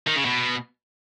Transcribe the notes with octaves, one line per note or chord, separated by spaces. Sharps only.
D#3
C#3
B2